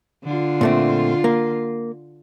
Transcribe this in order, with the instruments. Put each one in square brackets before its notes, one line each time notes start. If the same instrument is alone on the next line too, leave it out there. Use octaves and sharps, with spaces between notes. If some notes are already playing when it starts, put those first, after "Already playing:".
[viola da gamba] D3 F4
[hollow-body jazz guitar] A#2 A3 C4
A#3